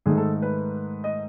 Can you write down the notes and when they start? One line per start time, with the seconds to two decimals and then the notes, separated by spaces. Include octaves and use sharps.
0.06 G#2 D#3 A3 D#4 G#4
0.17 A4
0.42 B4
1.04 D#5